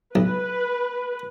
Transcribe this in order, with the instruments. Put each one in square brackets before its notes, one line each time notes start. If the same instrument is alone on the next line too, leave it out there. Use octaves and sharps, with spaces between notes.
[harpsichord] B1 [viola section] B4